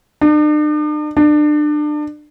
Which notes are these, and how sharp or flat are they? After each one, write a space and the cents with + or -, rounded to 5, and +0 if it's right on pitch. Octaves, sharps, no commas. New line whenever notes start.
D4 +45
D4 +30